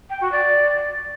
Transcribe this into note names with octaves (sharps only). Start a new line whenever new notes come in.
G5
F#4
D5